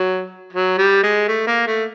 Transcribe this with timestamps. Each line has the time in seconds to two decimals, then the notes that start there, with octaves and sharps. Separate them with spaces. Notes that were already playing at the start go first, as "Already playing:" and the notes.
Already playing: F#3
0.52 F#3
0.78 G3
1.03 G#3
1.28 A3
1.47 A#3
1.67 A3